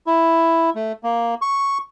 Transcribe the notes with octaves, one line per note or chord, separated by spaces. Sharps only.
E4
A3
A#3
C#6